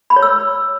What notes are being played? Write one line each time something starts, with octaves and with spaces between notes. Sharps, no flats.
B5
C#5
E6